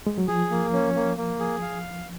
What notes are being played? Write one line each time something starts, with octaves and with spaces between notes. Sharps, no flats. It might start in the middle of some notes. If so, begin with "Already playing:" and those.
G#3
F#3
F3 G#4
A#3
C#4
A#3
A#3
G#4
F5